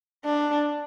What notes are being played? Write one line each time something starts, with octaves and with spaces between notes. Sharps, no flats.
D4